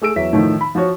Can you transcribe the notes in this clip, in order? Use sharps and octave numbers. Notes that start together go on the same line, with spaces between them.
A3 G#4 E6 D7
E2 F#3 E5 B6
A2 D#3 F3
B5
F3 F4 F#4 C#5